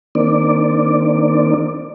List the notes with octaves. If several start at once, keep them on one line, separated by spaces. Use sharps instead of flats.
D#3 A#3 C4 D4 D5